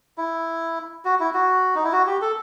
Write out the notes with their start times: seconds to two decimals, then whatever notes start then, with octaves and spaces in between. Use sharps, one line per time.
0.18 E4
1.05 F#4
1.20 E4
1.34 F#4
1.75 D#4
1.84 E4
1.92 F#4
2.07 G4
2.22 A4